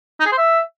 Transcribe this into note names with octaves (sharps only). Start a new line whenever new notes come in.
D#4
G#4
C5
E5